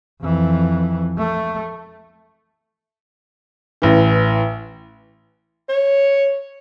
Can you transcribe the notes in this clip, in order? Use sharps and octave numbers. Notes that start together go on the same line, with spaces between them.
F2 E3
A3
A1 E3
C#5